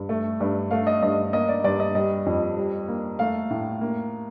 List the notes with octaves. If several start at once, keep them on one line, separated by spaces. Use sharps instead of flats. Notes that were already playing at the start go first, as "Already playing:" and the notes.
Already playing: G2
A3
G2
A3 F5
D#5
G2 D#5
A#3 D#5
D5
G2 D5
D#5
G3 D#5
F2
G3
A#3
A3 F5
A2
A#3